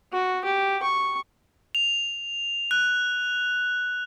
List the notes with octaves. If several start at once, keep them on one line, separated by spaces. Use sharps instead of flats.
F#4
G4
C#6
F7
F#6